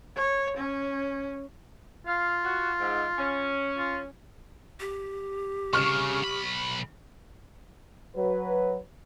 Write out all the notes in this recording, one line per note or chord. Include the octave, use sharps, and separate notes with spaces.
C#5
C#4
F4 F5
F#4
G#2
C#4
F4
G4
C2 C#3 C#6 F6
B1 B5
F#3 B4